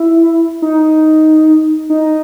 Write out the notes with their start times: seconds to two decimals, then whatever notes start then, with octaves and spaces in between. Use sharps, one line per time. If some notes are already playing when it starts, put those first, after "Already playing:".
Already playing: E4
0.62 D#4
1.90 D#4